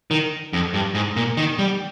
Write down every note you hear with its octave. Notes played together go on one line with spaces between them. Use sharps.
D#3
F2
G2
G#2
A#2
D#3
G3